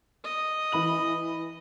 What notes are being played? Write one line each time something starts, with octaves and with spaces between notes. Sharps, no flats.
D#5
E3 B5 F#7